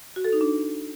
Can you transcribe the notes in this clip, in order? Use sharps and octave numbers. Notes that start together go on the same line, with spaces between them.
F#4
A4
D#4
D4